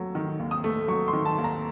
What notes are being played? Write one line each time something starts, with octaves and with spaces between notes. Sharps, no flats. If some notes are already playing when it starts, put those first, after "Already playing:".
Already playing: D#2 F#3 A3
D#3
D#2
D#6
A3
F#3 C#6
C6
D#3
A5
D#2
A#5